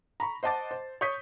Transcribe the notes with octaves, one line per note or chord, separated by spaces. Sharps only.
A#5 B5 C#6
C5 D#5 F#5 A5 D6 A6
C5
C#5 C#6 D#6 G6 B6